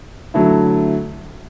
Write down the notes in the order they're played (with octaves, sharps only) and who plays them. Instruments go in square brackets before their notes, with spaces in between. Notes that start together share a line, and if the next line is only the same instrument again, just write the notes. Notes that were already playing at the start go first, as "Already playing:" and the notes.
[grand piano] D3 F#3 A3 E4